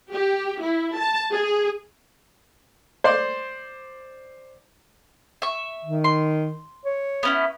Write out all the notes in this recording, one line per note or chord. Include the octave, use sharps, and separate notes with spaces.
G4
E4
A5
G#4
C5 D5 C6
E5 C#6
D#3
C6
C#5
B3 C#4 E4